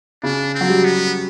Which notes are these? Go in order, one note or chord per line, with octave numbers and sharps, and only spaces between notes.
C#3 D4
C4
F#3
G3
B3